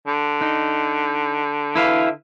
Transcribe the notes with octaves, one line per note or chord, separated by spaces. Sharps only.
D3
D#4
E4 B4 F5